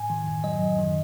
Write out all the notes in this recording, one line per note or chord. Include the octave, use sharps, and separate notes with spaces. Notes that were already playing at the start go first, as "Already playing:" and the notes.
Already playing: A2 G#5
D#3
F#2
F#3 D#5
F#2
D#3